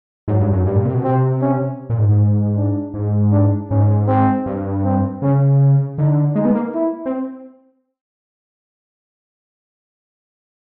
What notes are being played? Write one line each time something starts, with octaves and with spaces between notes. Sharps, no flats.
G#2 F#3
G2
F#2
G2 G3
A#2
C3
B2
C3 C4
C#4
A#2
G#2
G#2
D4
G#2
D4
G#2 C#4
C4
G2
C4
C#3 C#4
D3 D#4
G#3 D#4
B3
A#3
E4
C4